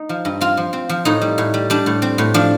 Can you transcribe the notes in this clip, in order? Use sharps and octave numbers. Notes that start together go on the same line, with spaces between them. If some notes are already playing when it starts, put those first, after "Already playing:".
Already playing: D#4
F3
G2
C4 F4
F3
C4
F3
A2 D#4
G3
A2
G3
G3 D4
A2
C4
A2
F3 D4